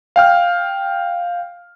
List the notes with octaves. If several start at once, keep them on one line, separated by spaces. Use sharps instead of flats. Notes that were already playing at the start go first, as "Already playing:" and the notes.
F5 G5 F6